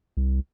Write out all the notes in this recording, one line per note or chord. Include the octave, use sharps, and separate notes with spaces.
C2